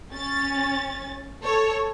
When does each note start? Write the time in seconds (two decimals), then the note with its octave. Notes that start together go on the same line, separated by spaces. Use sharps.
0.13 C#4 A6
1.43 A4 C#5